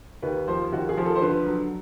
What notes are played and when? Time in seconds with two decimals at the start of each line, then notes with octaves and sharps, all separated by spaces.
0.22 D#2 B4
0.47 F3 C5
0.72 D#2 F#4
0.89 G#4
0.97 F3
1.05 A4
1.16 C5
1.22 D3 B4
1.47 F#3